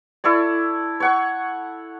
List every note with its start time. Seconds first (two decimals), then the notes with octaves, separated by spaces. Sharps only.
0.24 E4 A4 C#5 D5
1.00 C#5 F#5 C#6